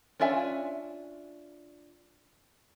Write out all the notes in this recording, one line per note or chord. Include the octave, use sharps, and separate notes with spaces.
C#4 D4 F4 E5 G#5